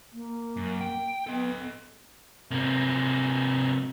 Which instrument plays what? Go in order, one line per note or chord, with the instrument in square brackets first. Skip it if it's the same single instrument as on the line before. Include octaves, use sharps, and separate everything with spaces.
[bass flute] A#3
[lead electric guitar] F#2
G5
[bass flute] B3 [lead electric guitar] A4 D#5
[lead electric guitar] C3 A#3